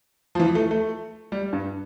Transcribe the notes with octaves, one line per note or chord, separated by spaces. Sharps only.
F3
E3
A3
A3
G3
G2